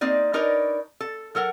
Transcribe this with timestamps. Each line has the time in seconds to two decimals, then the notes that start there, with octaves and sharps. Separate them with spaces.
0.01 A#3 C4 D#4 D5
0.33 D4 D#4 A#4 B4 C#5 D5
1.00 A4
1.35 F#3 A4 A#4 F#5